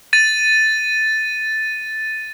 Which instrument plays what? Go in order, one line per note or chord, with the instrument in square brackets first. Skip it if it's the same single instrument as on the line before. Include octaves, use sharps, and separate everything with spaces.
[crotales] A6 D#7